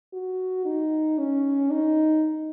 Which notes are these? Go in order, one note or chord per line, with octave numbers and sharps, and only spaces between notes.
F#4
D#4
C#4
D#4